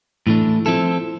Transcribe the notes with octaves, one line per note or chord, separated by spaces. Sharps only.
A2 E3 A3 D4
F3 C4 E4 A4